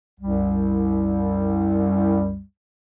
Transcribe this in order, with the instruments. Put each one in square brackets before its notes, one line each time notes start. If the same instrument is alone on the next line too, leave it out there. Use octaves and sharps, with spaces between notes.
[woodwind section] C2 F#2 G3